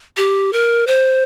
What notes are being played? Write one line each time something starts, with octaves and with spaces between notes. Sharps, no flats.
G4
A#4
C5